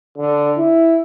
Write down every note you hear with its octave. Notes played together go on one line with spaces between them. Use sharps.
D3
E4